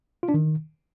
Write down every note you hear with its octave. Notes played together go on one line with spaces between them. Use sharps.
F4
D4
D#3